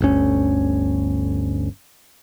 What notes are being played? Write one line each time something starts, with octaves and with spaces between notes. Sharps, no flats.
G1 D2 C#4